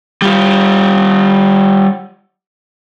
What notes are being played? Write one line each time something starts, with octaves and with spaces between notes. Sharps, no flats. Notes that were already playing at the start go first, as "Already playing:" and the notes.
G3 F4